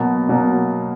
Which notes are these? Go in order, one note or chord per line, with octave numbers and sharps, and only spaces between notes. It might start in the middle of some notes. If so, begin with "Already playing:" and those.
Already playing: B2 F#3 A#3
B2 F#3 A#3